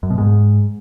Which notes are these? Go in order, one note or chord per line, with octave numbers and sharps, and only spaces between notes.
F#2
B2
G#2